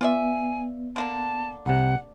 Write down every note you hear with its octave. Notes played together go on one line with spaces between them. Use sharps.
B3 F4 D5 E5 G#5
D3 A#3 D4 A5
C2 C3 F#5